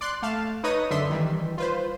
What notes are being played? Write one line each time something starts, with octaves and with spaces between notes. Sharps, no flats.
D5 C6 F#6
A3 F5 A5
D#4 B4 C#5 D#5 D#6
F#2 D3 D4 E5 C6 B6
D#3 E3 G3
F4 B4 C5